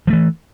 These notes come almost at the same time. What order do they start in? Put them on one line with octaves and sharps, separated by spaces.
F3 A3 E3